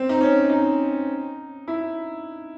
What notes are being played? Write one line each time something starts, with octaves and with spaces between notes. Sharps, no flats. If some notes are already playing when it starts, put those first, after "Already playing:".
Already playing: C4
D#4
C#4
D#4
E4